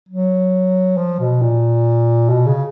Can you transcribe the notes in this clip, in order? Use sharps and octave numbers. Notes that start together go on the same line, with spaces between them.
F#3
F3
B2
A#2
B2
C#3